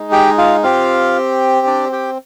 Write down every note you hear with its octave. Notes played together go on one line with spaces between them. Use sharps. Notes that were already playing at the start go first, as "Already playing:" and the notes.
Already playing: G#3 D#4
G4 G5
F4 F5
C4 F4 G4 F5
D4 D5
G4 G5